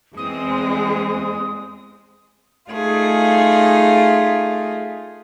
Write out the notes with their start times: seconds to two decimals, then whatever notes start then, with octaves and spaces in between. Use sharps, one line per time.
0.17 E2 G#3 C4 D#6
2.71 A3 D#4 F4 G#4